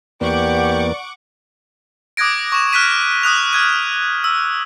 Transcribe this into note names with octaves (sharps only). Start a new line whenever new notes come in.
E2 A#3 B3 G4 D5 F#5 C#6 D6
D6 D#6 F#6 G#6 A#6 D7
C#6 E7
F6 F#6 G#6 B6 D#7 E7
D6 D#6 F#6 F7
F6 G#6 D#7
E6